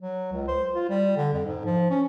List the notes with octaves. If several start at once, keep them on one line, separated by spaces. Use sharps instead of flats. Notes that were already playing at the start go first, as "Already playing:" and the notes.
F#3
C#2
C5
F4
G3
D3
F2
G#2
F3
C#4